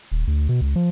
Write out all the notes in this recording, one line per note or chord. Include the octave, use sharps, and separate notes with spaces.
D#1
D2
B2
C#2
F3